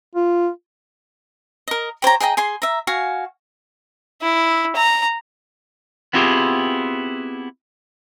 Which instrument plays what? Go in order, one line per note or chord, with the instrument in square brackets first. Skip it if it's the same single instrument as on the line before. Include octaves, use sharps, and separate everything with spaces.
[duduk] F4
[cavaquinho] A#4 D#5
G4 C5 C#5 A#5
G#4 D#5 G5 A#5
G#4 G#5 C6
E5 A#5
F#4 F5 G#5
[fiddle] E4
A#5
[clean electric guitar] B3 C4 E4 F4 G4 G#4